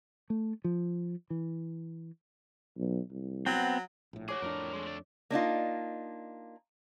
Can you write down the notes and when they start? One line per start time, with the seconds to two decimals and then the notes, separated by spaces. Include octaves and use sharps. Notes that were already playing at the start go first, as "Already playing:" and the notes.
0.30 A3
0.64 F3
1.30 E3
2.77 B1
3.10 C2
3.46 F#3 B3 C4
4.13 A#1 A2
4.29 F#4 G#4 C#5 D6
4.42 F2 A2 B3 D4 A#4
4.73 G#3 A3
4.86 A3 D5
5.30 A#3 D4 D#4 F4